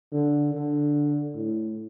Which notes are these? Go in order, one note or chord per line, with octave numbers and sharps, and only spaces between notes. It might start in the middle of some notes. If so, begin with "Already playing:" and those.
D3
D3
A2